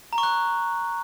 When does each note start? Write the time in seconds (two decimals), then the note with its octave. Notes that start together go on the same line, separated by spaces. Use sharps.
0.13 A#5
0.18 C#6
0.23 F#6